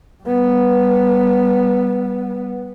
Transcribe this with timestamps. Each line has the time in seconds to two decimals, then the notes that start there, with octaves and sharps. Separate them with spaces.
0.24 G3 B3